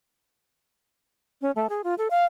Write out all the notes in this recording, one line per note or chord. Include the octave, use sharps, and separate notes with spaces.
C#4
A3
G#4
F4
A4
F5